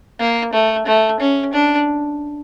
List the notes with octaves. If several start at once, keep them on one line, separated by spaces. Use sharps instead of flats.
A#3
A3
A3
C#4
D4